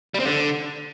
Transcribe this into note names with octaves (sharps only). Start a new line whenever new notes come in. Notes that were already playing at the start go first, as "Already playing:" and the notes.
G3
C4
D3